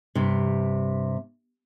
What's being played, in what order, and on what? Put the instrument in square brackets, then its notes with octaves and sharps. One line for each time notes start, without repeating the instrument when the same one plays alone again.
[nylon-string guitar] G2 C3